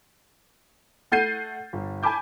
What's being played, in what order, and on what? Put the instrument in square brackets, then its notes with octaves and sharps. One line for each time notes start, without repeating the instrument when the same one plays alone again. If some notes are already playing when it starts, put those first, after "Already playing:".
[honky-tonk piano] A3 F#5 G6 A6 C7 D#7
G1
G#5 A5 B5 D6 G6